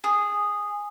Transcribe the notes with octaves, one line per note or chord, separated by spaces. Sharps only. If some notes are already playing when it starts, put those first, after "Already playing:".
G#4